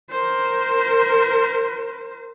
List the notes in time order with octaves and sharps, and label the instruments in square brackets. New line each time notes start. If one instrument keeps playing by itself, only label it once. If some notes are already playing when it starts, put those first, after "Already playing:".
[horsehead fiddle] A#4 C5